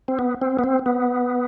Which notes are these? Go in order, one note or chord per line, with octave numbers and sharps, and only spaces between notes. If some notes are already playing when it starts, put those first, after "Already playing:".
C4
B3
C4
B3
C4
B3